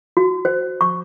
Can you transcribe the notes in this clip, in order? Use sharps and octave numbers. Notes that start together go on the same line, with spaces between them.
F#4
C5
C#6